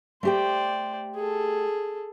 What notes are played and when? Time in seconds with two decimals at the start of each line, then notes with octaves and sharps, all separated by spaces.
0.23 A3 G4 C5 D5 G5
1.16 G#4 A4